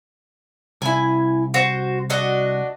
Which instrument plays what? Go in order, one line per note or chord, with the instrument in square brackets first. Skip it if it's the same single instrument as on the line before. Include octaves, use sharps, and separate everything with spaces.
[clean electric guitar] C2 [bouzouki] E4 G#5
[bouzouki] F#4 C5
D4 F#4 D#5